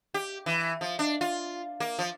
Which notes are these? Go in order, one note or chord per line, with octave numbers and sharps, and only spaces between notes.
G4
E3
F3
D4
F4
A#3
F3